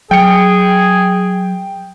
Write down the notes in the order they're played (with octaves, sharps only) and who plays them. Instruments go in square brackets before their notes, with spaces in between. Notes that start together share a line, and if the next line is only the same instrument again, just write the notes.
[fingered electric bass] F#3 [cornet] G#4 [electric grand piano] G5 C#7